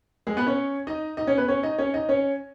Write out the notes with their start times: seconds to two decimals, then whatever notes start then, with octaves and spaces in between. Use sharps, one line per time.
0.27 G#3 G#4
0.37 B3 B4
0.46 C#4 C#5
0.87 D#4 D#5
1.17 D#4 D#5
1.27 C#4 C#5
1.38 B3 B4
1.48 C#4 C#5
1.63 D#4 D#5
1.78 C#4 C#5
1.94 D#4 D#5
2.09 C#4 C#5